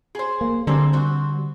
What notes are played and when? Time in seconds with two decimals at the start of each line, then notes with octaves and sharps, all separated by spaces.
0.15 G#4 C5
0.41 A#3
0.67 D3 G3 A#3 C4 G#4
0.93 C4 F#4